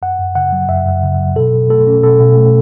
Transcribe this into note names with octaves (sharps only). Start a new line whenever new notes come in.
F#2 F#5
F#2
C#3 F#5
F#3
F#2 E5
F#2
C#3
F#3
B2 A4
B2
A3 A4
C#4
B2 A4
B2
A3